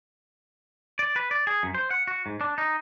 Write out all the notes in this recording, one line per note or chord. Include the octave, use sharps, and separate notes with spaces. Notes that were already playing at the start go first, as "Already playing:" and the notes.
D5
B4
D5
G#4
F#2
C5
F#5
F#4
G#2
D4
D#4